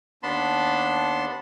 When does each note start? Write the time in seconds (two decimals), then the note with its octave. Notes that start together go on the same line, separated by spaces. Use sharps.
0.23 D#2 B3 D4 A5 B5 C6